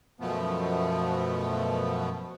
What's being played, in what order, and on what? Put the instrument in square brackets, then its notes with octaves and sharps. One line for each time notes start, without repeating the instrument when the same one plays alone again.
[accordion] F#2 B2 F3 A3 B3